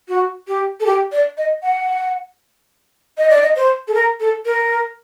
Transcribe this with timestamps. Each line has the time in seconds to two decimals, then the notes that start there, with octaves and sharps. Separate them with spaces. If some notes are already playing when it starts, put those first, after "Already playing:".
0.08 F#4
0.48 G4
0.80 A4
0.86 G4
1.12 D5
1.37 D#5
1.63 F#5
3.17 D#5
3.29 D5
3.42 D#5
3.56 C5
3.87 A4
3.94 A#4
4.20 A4
4.45 A#4